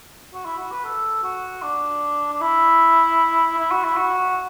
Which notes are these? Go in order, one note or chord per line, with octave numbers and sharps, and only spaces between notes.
F#4
E4
F#4
B4
A4
F#4
D4
D4
E4
E4
F#4
E4
F#4